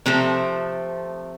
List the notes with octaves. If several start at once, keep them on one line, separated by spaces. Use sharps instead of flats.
C3 F3 A3 C4